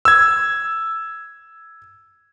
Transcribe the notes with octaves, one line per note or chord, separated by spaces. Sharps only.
E6 G#6